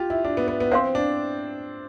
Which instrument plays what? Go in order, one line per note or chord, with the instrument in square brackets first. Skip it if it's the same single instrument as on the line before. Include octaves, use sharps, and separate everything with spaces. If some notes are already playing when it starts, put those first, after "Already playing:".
Already playing: [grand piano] F4 G4
E4
D4
B3
B3
B3
[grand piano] C4 [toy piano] C5 F5 C6
[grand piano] D4